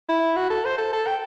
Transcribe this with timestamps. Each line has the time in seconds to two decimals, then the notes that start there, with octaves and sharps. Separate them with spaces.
0.09 E4
0.36 F#4
0.50 A4
0.65 C5
0.78 A4
0.93 A4
1.07 G5